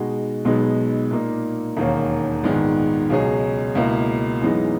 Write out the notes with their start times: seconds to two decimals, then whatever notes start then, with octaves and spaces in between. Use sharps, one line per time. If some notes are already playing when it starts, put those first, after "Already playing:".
Already playing: B2 G#3 D#4 F#4
0.45 B1 B2 G#3 B3 D#4
1.11 A#2 A#3 D#4
1.77 E1 D#2 D#3 A#3 C#4
2.43 A#1 G#2 D#3 G#3 B3
3.10 C#2 B2 F#3 C#4 G#4
3.75 C#2 B2 A#3 E4
4.41 F#2 E3 G#3 B3 D#4